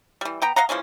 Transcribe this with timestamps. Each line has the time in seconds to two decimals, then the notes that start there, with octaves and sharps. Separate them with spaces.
0.21 E3 G3
0.42 B3 G5 A#5
0.56 D#5 F5 F#5 A#5
0.69 E3 F3 G#3 C#4